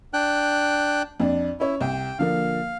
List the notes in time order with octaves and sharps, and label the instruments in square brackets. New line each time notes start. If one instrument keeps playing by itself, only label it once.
[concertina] D4 G5 F#6
[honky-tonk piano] F2 D4
[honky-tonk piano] C#4 C#5 [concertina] E4
[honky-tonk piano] C2 [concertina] G5
[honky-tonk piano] D3 F3 A#3 [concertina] F5